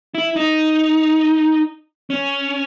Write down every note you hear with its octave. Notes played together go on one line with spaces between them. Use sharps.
E4
D#4
C#4